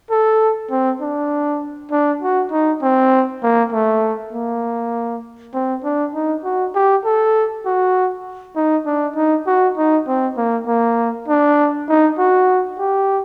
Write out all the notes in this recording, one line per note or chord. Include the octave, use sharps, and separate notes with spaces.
A4
C4
D4
D4
F#4
D#4
C4
A#3
A3
A#3
C4
D4
D#4
F#4
G4
A4
F#4
D#4
D4
D#4
F#4
D#4
C4
A#3
A#3
D4
D#4
F#4
G4